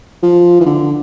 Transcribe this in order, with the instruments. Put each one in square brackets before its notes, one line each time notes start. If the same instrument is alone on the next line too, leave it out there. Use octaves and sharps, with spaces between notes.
[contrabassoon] F3
E3
D3